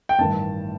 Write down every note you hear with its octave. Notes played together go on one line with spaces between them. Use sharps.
G5
A1 G2 D#3 A5